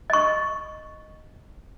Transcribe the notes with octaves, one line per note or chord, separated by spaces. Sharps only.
D#5 C#6